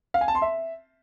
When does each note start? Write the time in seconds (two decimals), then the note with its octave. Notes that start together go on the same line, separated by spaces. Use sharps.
0.14 F5
0.21 G#5
0.28 A5
0.35 C6
0.42 E5